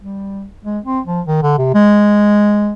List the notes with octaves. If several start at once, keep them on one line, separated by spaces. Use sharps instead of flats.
G3
G#3
C4
F3
D#3
D3
C3
G#3